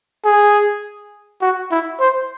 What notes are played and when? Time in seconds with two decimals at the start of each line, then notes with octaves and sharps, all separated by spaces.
0.25 G#4
1.42 F#4
1.71 E4
2.00 C5